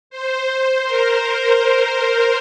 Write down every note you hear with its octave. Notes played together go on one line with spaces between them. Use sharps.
C5
A#4